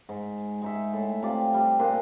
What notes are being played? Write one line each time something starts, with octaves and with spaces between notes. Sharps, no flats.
G#2
G#3 D#4 E5
A2
C3 F4 D5 D6
G3
A#2 D4 C5 G#5